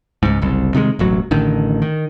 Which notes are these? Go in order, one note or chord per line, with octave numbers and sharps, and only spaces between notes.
C#2 G#2
F#1 C2
C3 D#3 F#3 G#3
E1 A1 F#3
A1 D3 D#3
D#3